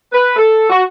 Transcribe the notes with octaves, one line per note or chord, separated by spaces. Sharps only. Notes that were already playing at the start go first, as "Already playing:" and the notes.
B4
A4
F#4